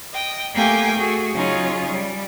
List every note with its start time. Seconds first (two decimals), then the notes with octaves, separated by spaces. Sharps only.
0.14 D#5 G5
0.54 A3 A#3 G4 G5 G#5
0.98 A3 F#4 G#4
1.34 C#3 F#3 C#4 D#4 F4 G#4
1.90 G3